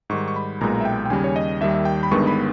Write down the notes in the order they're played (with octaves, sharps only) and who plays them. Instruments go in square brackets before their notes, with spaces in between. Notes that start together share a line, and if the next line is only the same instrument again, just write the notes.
[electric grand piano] G#2 D#3 G3 C#6
C#6
B5
B1 A#2 G#3 B3 A#5
E5
G5
G5
D#2 C#3 G3 G#5
C#5
D#5
D#2 D#3 G3 E5
E5
G5
B5
G1 G2 D#3 G#3 B3 C#6
B5